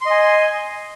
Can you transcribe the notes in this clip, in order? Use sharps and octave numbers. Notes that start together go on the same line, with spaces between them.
D#5 G#5 C6